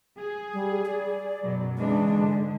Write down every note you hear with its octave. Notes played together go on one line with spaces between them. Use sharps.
G#4
G3
D5
F#2 B2 F#3
C#3 E3 G#3 D4
G#2 D3